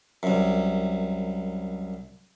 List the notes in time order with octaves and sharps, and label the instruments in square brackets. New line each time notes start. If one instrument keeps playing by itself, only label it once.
[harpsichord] C2 F#2